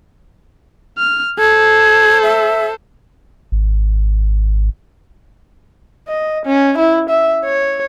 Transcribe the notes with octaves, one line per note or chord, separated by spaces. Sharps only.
F6
A4 C5 G#6
E5
G#1
D#5
C#4
E4
E5
C#5